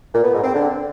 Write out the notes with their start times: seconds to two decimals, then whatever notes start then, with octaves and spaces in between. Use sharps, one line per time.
0.14 A#2
0.24 B3
0.34 G#2
0.44 C4
0.54 D3